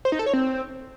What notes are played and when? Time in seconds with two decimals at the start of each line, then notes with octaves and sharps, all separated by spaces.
0.05 C5
0.12 D#4
0.19 A4
0.26 C#5
0.33 C4